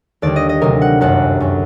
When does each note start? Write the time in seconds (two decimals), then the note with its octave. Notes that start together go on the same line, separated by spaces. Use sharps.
0.22 D#2 D3 G3 D5
0.36 D#5
0.49 D#5
0.61 D2 C3 F#3 A#4
0.82 F#5
1.01 G1 F#2 F#3 F#5
1.40 F#2 F#3